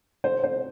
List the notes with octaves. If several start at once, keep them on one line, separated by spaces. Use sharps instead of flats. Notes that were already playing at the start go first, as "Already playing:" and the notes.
C5
C5